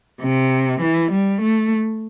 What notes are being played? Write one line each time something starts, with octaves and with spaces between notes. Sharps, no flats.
C3
E3
G3
A3